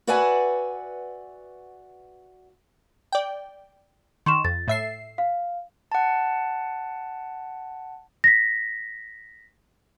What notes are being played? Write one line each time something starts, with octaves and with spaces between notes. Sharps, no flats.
F#4 B4 D5 E5 F#5 G#5
D5 G5
D#3 C6 C#6 E7
F2 A6
A2 E5 C7
F5
F#5 A5
A#6 B6